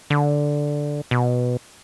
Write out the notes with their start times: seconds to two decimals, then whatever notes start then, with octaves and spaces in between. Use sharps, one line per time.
0.10 D3
1.11 B2